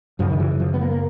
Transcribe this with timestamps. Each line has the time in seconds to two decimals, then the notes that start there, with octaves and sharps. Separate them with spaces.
0.19 F#2 C#3 F3
0.31 D#3
0.40 E3
0.60 F3
0.74 B3
0.81 A#3
0.91 A#3